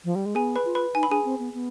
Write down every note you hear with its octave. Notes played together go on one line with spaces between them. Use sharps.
F3
G3
G#3
B3 G#4 G#5
B4 B5
F4
B4 B5
D#4 G#5
B5
D4 G#4 G#5
C4
B3
B3